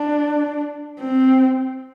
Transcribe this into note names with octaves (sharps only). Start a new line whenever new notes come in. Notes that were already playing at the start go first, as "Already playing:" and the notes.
Already playing: D4
C4